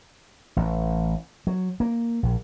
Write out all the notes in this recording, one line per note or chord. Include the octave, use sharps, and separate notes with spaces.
A1
F#3
A#3
A#1